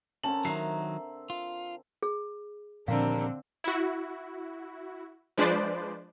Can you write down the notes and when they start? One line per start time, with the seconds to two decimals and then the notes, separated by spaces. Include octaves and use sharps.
0.23 D3 D#3 C4 C#4 A5 F#7
0.45 D#3 F#3 E5 A#5 C7
1.30 F4
2.03 G#4
2.88 D#2 A#2 D3 F3 C4 D4 A#4 F5
3.64 E4 F#4
5.38 F3 G#3 D4 B4 C5 D5